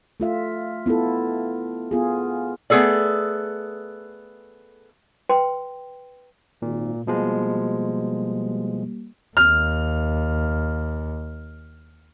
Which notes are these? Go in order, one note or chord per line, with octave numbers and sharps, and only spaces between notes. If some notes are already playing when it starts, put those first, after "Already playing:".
A3 F4 E5
B3 E4 F4 A4
B3 F4 G#4
A3 B3 G#4 A4 D5
B4 G5 C6
G#1 A#2
B2 F3 G3 G#3 A#3
D#2 F6